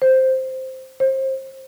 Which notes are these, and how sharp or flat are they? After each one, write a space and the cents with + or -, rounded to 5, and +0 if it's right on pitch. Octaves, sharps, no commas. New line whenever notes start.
C5 +0
C5 +30